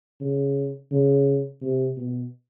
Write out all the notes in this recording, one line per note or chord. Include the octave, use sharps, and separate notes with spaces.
C#3
C#3
C3
B2